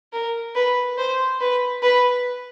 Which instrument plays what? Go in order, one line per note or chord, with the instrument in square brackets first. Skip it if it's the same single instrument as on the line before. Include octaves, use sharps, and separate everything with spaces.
[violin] A#4
B4
C5
B4
B4